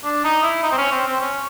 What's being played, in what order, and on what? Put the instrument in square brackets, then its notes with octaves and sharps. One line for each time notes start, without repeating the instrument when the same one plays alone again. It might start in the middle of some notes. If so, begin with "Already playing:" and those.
[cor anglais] D4
D#4
E4
D#4
C4
C#4
C4
C4
C#4